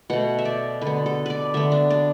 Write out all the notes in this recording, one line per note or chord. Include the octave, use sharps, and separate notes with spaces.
B2 A3 F#5
E5
D5
D3 B4
B3
A4
B4 D5
D3 B3 E5
D4
D4